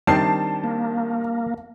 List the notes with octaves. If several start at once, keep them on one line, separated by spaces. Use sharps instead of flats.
D#3 G3 C4 D4 A5 C7
A#3